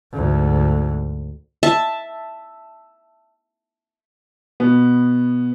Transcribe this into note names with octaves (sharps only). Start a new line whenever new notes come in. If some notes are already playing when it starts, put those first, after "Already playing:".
D2 G#2
E5 A5
B2 B3